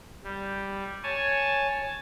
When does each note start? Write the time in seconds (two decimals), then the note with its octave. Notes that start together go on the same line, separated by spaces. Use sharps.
0.24 G3
1.03 C#5 G#5 A5